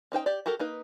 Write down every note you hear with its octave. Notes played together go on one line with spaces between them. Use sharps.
C#4 D#4 C5 G5
G4 D5
F#4 G4 A4 A#4
A#3 D#4 B4